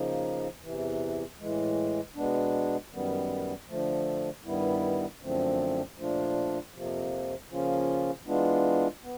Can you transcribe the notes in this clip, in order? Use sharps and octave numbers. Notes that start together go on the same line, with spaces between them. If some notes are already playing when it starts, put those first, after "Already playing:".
Already playing: C#3 F3 A#3 D#4
E2 C3 E3
A2 E3 G#3
B2 G#3 B3 D4
F#2 D#3 G3 B3
D3 F3 A3
G2 D#3 G3 B3 E4
F#2 D3 F3 A3 C4
A#2 F3 A3 D4 F4
F2 C3 F3 A#3
C#3 F3 A#3 C#4 F4
E3 G#3 B3 D4 F4
B3